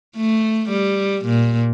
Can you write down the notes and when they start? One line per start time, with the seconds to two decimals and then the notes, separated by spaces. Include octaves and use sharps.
0.17 A3
0.69 G3
1.25 A#2